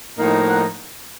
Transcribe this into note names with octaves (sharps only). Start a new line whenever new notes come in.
A2 F3 A#3 D#4
F#5